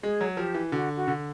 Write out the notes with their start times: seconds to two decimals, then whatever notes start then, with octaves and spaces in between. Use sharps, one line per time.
0.03 G#3 G#4
0.21 F#3
0.37 F3 G4
0.54 E3
0.72 D3 F#4
0.96 F#4
1.08 D3